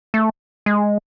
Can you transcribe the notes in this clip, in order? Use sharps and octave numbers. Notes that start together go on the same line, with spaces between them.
A3
G#3